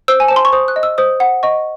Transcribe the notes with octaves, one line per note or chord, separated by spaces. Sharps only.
C5 E6
G#5
C5 A5
C6
C#6
C5 D#6
F#6
D#5
E6
C5 D#6
F#5
D#5 C#6